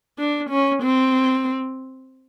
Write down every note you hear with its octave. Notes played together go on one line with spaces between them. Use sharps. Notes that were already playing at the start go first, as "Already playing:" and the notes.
D4
C#4
C4